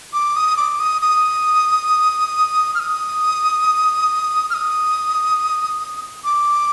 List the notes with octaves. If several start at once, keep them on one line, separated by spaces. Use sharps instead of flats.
D6
D#6
D6
D#6
D#6
F6
D#6
F6
D#6
D6